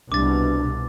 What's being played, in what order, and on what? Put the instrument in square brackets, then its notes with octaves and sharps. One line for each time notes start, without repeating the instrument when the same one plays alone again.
[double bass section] C2 B2 [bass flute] D4 [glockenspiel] D6 A6